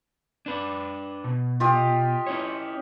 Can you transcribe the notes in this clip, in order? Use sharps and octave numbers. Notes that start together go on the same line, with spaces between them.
D4 B4
B2
F4 G4 D#5
C#4 E4 C#5